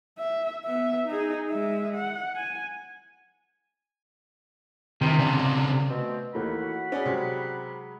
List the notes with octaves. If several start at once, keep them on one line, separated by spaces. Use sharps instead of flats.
E5
B3 E5
D#4 G#4
G#3 E5
F#5
G#5
C3 D#3 E3
C#3 D4
B2 A3 C4
D#2 E3 A3 A#3 F#5 B5
F#4
C#4 G#4 D5
C3 F#3 G#3